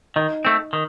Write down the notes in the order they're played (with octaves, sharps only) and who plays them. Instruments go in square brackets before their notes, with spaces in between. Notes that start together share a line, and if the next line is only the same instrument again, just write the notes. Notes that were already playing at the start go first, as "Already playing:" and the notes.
[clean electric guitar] D#3 [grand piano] D#4
[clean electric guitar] A3 C4
D#3